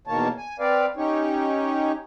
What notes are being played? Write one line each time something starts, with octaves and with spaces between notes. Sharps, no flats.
E2 B2 D#3 A#3 C#5 A5
G#5
C4 B4 D5 F5
C#4 D#4 G4 C#5